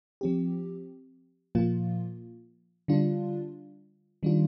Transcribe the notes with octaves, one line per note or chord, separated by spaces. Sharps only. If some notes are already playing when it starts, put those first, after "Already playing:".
F3 C4 G4
A#2 F3 A#3 F4
D3 G3 D4 F4
D#3 G3 D4 F4